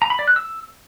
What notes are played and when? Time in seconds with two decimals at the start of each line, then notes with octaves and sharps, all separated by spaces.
0.02 A#5
0.10 B5
0.19 D5
0.28 F#6
0.36 E6